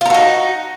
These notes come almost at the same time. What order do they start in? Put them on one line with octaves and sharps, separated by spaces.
F4 A#4 F#4 D#4